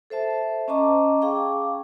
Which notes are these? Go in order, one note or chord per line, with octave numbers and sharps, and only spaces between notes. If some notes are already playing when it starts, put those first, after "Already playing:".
A4 C5 E5 A5
C#4 D#5 A5 A#5 C#6 D6
G#4 F5 G5 C#6 D6